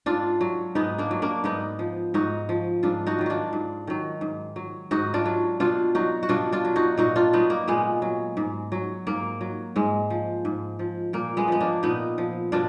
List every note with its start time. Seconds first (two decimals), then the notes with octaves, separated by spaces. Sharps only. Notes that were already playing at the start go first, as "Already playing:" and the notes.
0.06 G#2 D4 F4
0.41 F#3
0.75 G#2 B3 D#4
0.98 A#3 D4
1.11 F#3
1.22 A#3 D4
1.44 G#2 B3 D#4
1.79 F3
2.14 G#2 D#4 F#4
2.49 F3
2.83 G#2 D4 F4
3.07 D#4 F#4
3.18 D#3 F#3
3.26 D4 F4 F#4
3.53 G#2
3.87 D#3 F#3
4.21 G#2
4.56 F#3
4.91 G#2 D#4 F#4
5.14 D4 F4
5.25 F#3
5.60 B2 D4 F4
5.95 F#3 D#4 F#4
6.23 F#4
6.29 B2 D4 F4
6.52 D4 F4
6.65 F#3
6.76 D#4 F#4
6.97 A#2 D#4 F#4
7.16 D4 F4
7.33 F#3 B3 D#4
7.50 A#3
7.68 A#2 G#3 B3
8.02 F#3
8.37 G#2
8.72 F#3
9.07 G#2 A#3
9.41 F#3
9.76 G#2 G#3
10.10 F3
10.45 G#2
10.79 F3
11.13 A#2 A#3
11.37 G#3 B3
11.48 F3 B3
11.60 A#3 D4
11.83 A#2 B3 D#4
12.18 F3
12.52 B2 D4 F4